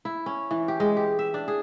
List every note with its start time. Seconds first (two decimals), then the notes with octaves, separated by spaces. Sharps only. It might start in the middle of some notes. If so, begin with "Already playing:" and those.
0.05 E4
0.26 C#4
0.51 E3
0.68 G4
0.80 G#3
0.97 G4
1.19 E5
1.34 D4
1.48 G#4